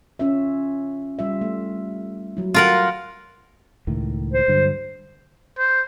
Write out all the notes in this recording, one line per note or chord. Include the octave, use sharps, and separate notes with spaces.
C#4 F4 E5
G3 F4 E5
A3
F#3 E4
F4 A#4 F#5
C#2 A2 D#3
C5
G2 D3 F#3
C5